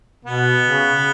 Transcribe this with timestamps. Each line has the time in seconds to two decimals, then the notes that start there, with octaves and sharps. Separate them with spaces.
0.25 B2 B3
0.65 C#3